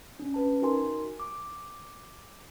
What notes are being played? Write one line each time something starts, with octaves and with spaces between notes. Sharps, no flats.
C#4 D4
C#4 B4 A5
D#4 F#4 A#4 G#5 C6
D6